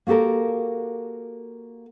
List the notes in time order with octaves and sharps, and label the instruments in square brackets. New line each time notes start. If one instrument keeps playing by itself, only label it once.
[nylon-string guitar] A#3 F#4 G4 A4 A#4